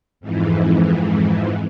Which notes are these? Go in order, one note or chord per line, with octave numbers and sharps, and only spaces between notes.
F2 G#2 E3